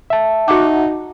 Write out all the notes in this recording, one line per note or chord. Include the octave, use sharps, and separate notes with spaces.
E5 A5
D#4 F#4 F#5 D6